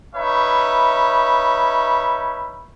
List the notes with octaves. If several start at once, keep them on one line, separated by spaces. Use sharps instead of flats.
C#4 D#4 B4 C#5 E5 B5